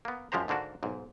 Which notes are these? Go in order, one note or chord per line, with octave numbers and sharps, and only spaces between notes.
A#3 B3
F#2 F3 G#3 G4 C5 A#5
G#2 D3 A#3 D4 F#4
B1 G#2